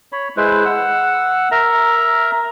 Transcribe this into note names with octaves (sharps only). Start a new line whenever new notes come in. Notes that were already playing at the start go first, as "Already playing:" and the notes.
C#5 B5
G#3 E4 B4 C5
F#5 E6
A#4 E5 A#5